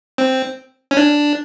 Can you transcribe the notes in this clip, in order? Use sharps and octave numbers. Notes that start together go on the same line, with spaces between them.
C4
C#4
D4